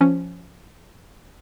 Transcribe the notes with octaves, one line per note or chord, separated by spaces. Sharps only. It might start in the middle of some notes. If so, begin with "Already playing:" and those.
F3 C#4